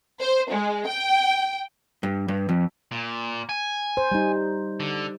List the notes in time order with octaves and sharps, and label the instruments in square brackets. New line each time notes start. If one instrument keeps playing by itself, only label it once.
[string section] C5
G#3
G5
[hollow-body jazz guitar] G2
G2
F2
[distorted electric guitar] A#2
G#5
[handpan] C5
G3 D#4
[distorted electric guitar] D3